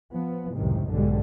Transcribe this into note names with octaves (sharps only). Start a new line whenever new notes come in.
F3 B3
C#2 F#2 A2 C3 D#3
B1 G#2 D3 G3 G#3